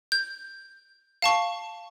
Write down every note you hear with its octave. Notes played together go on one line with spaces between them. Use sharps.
G6
F5 A5 C#6